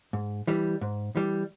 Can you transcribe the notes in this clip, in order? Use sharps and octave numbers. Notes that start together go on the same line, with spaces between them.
G#2
E3 G3
G#2
E3 G3